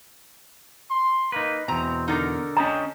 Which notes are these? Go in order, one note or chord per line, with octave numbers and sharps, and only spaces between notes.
C6
A#3 D#4 B4
E2 B2 C4 A#5
D3 D#4 A#4
C#4 D#5 G5 A5 A#5